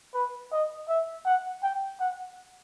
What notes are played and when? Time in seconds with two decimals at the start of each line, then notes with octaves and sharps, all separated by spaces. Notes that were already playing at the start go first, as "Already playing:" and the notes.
0.14 B4
0.52 D#5
0.89 E5
1.26 F#5
1.63 G5
2.00 F#5